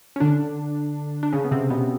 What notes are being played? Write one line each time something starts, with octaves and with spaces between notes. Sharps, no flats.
C#4
D3 D4
D4
C#3 C#4
B3
C3 C4
B2 B3